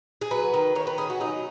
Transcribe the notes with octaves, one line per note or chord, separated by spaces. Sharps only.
G#4
F#3 B4
D#3
D#3 C#5
B4
C#4 G#4
F#4
F#3 D#4